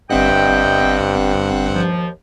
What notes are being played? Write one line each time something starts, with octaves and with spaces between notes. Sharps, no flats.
G1 G2 C4 D#5 E5 F#5 G5
D#2 F3